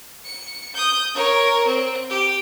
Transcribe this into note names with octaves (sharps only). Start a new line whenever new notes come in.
C#7
D#6 G6
A#4 C#5
C4
G4